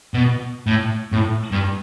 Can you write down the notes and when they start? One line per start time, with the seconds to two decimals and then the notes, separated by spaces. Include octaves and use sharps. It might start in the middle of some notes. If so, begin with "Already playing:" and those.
0.14 B2
0.67 A2
1.12 A2
1.51 G2